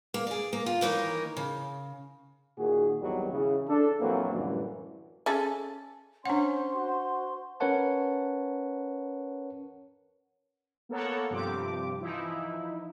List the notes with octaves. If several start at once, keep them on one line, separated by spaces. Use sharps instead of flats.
A#3
G#4 D5
A#3
F4
D#3 E3 A#3 D#4 A#4 C#5
C#3
A#2 D#3 F#4 G#4
G#1 E2 D#3 F#3 G3 G4
C#3 E3
D4 A4
A#1 F2 E3 F#3 A#3 C4
F#2 A2 D3 E3 G3
C#4 G#4 A4
C#4 D4 C5 F#5 C6
F#4
C#4 A#4 B4 C#5 F#5 A5
A#3 B3 A4 A#4 C#5 F#5
G2 C3 F3 C4 G4 D6
E3 F3 D#4 E4